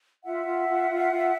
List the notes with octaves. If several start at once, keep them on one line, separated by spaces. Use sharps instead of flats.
F4 E5 F#5
F4
F4
F4
F4